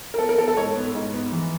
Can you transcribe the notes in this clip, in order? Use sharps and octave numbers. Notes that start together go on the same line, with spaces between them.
A#4
B3 A4
A#4
B3 A4
A4
G#2 C#5
B3
G#2
B3
E3